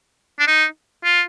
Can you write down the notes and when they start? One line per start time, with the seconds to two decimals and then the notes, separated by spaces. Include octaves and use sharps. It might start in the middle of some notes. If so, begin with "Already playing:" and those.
0.39 D4
0.47 D#4
1.04 F4